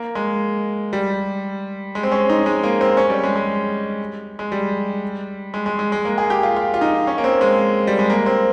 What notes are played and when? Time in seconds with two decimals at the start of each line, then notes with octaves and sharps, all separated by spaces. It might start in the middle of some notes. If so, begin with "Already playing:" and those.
Already playing: A#3
0.15 G#3
0.93 G3
1.95 G#3
2.03 C4
2.12 C#4
2.29 D#4
2.46 G#3
2.63 A#3
2.81 C4
2.97 C#4
3.10 G3
3.23 G#3
3.36 G#3
4.39 G#3
4.52 G3
5.54 G#3
5.66 G#3
5.79 G#3
5.92 G#3
6.05 A#3
6.18 G#4
6.30 G4
6.43 F4
6.56 F4
6.74 F4
6.81 D#4
7.07 C#4
7.18 A#3
7.24 C4
7.41 G#3
7.87 G3
7.99 G#3
8.10 A#3
8.26 C4